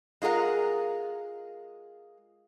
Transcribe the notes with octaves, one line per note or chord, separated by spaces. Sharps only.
G#3 F4 G#4 A#4 F#5